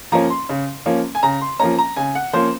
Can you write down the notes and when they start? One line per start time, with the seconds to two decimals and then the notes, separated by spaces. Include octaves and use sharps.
0.12 F3 A#3 C#4 A#5
0.30 C6
0.49 C#3
0.86 F3 A#3 C#4
1.15 G#5
1.23 C#3 A#5
1.41 C6
1.59 F3 A#3 C#4 A#5
1.78 A#5
1.97 C#3 G#5
2.15 F#5
2.33 F3 A#3 C#4 C5